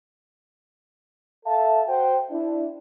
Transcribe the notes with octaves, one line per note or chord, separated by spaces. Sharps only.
A4 E5 F5 A5
F#4 C5 F#5 G5
D4 E4